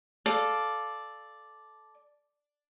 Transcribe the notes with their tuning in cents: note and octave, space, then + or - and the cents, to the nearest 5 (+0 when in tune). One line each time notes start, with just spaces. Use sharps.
A4 -15 D5 +0 F5 +5